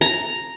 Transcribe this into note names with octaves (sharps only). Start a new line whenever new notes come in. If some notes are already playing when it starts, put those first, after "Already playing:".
A#5